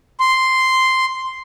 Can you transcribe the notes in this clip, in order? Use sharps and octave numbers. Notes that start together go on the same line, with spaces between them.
C6